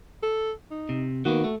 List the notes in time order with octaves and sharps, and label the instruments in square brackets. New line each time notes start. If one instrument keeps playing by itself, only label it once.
[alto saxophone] A4
D#4
[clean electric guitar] C3
[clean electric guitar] D#3 A#3 B3 [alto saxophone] F#4
[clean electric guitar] A3